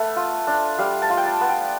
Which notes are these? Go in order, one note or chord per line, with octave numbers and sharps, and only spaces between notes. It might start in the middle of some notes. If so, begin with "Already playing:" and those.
Already playing: A3 B3
F4
D4
G3 F5
A5
F4
G5
A5
B3
G5